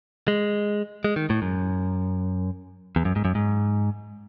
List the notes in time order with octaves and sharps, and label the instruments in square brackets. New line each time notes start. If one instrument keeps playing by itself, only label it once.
[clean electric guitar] G#3
G#3
D#3
A2
F#2
E2
F#2
G#2
F#2
G#2